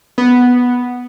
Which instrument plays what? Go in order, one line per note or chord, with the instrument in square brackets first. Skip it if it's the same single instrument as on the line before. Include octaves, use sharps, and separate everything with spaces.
[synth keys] B3